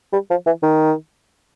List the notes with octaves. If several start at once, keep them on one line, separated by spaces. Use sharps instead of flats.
G3
F3
E3
D#3